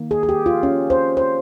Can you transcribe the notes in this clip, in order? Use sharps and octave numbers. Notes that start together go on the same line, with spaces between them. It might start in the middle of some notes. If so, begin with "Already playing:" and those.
Already playing: D#3 A#3
G#4
G#4
G4
F4
C#4
C5
C5